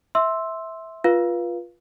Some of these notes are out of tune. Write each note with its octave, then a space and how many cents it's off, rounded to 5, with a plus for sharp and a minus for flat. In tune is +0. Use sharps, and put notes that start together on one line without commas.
E5 -15 C6 +10 E6 +0
F4 +0 B4 -25 F5 -5